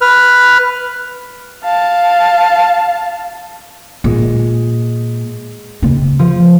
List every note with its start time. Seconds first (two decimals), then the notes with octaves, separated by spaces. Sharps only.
0.01 B4 F6
1.64 F5 A5
4.04 A#2 G#3
5.82 C#3 D#4
6.19 F3